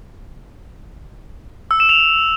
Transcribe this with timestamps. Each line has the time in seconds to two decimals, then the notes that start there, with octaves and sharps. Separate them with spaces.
1.71 E6
1.80 E7
1.89 F7